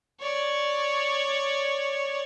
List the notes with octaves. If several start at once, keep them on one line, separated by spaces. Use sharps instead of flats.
C#5 D5